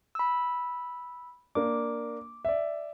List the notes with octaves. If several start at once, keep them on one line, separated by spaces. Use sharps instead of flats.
B5 E6
A#3 D4 D6
D5 E5